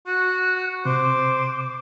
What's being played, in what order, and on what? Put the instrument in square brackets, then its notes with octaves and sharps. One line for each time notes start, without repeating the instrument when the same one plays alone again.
[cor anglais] F#4 [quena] F#6
[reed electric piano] C3 [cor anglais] C5 [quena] D6